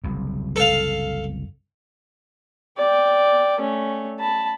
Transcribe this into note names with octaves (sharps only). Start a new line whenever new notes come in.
F#1 C2 F#2
A4 F5
D5 G5
A3 C#4
A5 B5